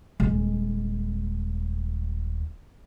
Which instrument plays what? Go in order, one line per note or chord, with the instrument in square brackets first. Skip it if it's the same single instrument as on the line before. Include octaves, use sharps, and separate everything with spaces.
[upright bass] D#1 G#3